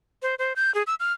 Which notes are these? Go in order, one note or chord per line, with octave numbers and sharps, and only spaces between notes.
C5
C5
G6
G#4
E6
F6